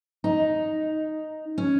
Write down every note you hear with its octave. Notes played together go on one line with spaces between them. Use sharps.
D#4
C#4